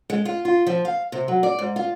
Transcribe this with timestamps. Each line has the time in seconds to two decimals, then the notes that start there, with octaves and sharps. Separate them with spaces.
0.10 G#3
0.25 F4
0.45 F4
0.67 F3
0.85 F5
1.12 C3
1.28 F#3
1.43 D5
1.59 G#2
1.76 F4